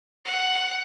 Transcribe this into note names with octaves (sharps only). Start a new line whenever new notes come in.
F#5